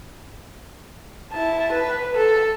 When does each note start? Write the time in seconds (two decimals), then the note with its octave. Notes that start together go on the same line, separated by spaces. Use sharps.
1.33 E4 A5
1.73 B4
2.16 A4